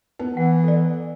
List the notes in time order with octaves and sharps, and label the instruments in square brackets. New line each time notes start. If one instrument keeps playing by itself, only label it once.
[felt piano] B3 [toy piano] D#4
[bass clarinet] E3 [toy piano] F#5
[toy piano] A4 D5